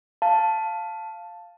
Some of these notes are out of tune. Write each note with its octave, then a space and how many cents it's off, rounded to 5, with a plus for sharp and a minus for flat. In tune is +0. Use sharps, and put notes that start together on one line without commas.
F5 +0 A5 +0